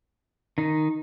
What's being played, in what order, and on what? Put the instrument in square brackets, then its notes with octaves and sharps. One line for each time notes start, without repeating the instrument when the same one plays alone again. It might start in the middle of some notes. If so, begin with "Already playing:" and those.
[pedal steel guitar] D#3 D#4